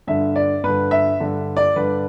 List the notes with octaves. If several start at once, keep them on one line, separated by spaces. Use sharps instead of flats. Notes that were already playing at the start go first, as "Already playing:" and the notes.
G2 D3 E5
D5
G2 D3 B4
E5
G2 D3
D5
G2 D3 B4